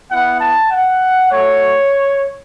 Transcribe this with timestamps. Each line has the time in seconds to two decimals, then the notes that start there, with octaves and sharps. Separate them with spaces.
0.11 B3 E4 F#5
0.41 A5
0.71 F#5
1.32 A3 F#4 C#5